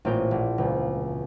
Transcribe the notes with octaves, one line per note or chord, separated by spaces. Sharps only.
A1 A#2 C4 F4 A#4 G6
A#1
E1 C#2